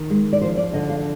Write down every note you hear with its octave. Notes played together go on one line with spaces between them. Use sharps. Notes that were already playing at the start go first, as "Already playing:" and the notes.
Already playing: D#3
G#3
D5
F3 C5
D5
D3 D#5
F5